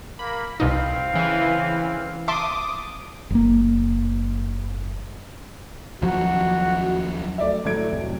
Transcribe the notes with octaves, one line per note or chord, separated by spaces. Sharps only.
A#3 B5
C2 B2 C4 D#4 F5
C#3 E3
E5 A5 C6 D6 D#6
F#1 A#3
D#2 F3 F#3 F#4
A3 D5 E5
A2 F#3 A3 G#6 D7
F1